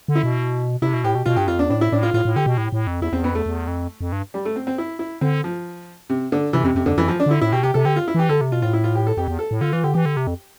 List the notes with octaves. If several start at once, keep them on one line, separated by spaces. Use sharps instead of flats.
D3
E4
B2
C3 E4
B2
A2 G4
B2
B2 F4
G2 G4
F2 F4
E2 D4
A2 D4
E4
A2 D4
F4
A2 F4
A2
D3 G4
B2
A2
A2
F2
E2 E4
E2 C4
F2 B3
E2 A3
E2
F2
F2
G2
G3
A3
C4
C4
E4
E4
D3 C4
F3
C3
D3
C3 E3
F2 C3
F2 C3
F2 D3
F2 E3
F3
D4
D3 E4
A2 E4
B2 G4
C3 G4
C3 A4
D3 G4
F4
E4
E3 G4
D3 A4
C3
B2 F4
A2 F4
E4
F4
G4
A4
F2 G4
E2
A4
A2
D3 F4
E3 F4
D3 G4
E3 G4
D3
C3
F2